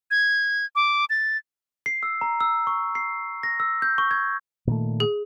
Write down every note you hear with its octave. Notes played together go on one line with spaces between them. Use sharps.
G#6
D6
A6
C7
E6
A#5
E6
C#6
C7
A#6
E6
G6
C#6
G#6
A#2 D#3 A3
G#4